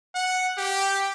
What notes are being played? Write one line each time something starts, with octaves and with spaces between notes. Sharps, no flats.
F#5
G4